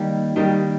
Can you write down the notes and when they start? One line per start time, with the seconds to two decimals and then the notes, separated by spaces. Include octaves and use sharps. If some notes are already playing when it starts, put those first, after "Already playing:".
Already playing: D#3 G3 A#3
0.36 D#3 G3 A#3